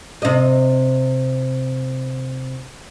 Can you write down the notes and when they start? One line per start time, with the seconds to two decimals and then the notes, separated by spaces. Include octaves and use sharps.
0.22 C3 D#5